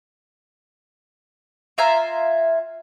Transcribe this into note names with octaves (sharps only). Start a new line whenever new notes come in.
F4 E5 G#5 A#5